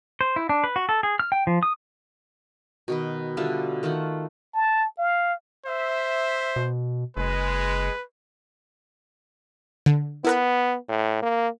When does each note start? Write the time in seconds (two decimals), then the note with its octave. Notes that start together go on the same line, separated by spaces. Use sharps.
0.21 C5
0.36 E4
0.49 D4
0.64 B4
0.76 F#4
0.89 A4
1.03 G#4
1.19 F6
1.32 G5
1.47 F3
1.63 D#6
2.88 B2 D#3 B4
3.37 D3 G3 F4 E5
3.83 D#3 A3 F4 F#5
4.54 A5
4.98 F5
5.66 C5 E5
6.56 B2
7.17 F#1 G#3 B4
9.86 D3
10.25 B3 E4 A#4 B4
10.88 A2
11.22 A#3